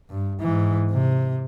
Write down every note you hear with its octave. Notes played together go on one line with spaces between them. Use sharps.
G2
G#2 E3
C3